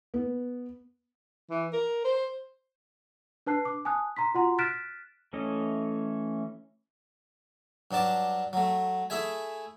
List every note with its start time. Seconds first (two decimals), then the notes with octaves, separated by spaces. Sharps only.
0.14 B3
1.50 E3
1.73 A#4
2.04 C5
3.46 D4 B4 A5 F#6 C7
3.65 D6
3.85 G#5 A5 D#6 F#6
4.16 A#5 C6 B6
4.35 F4 F#4 F#5 A#5 C6
4.58 F6 F#6 A6 B6 D7 E7
5.33 E3 A3 C#4 A4 D#5
7.91 G2 F#3 D4 A5 D6
8.53 F#3 A3
9.10 A3 E4 G#4 E5 G#5